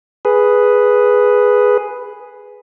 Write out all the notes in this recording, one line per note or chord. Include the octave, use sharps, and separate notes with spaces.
G#4 B4